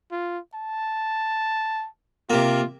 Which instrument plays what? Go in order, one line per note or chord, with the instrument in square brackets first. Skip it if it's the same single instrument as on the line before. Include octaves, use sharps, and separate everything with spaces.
[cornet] F4
A5
[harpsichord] C3 A#3 [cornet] F4